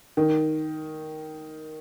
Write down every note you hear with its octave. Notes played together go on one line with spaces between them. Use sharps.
D#3